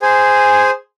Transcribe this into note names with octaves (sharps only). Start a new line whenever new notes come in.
G#4 C5 G#5